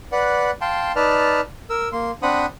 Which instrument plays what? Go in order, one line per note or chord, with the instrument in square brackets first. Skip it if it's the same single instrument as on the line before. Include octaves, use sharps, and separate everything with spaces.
[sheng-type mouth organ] B4 D5 F#5
F5 G5 A5 C6
D#4 B4 D5 A5 F6
A#4 E6
A#3 C6
C4 D4 C5 F#5 B5 D#6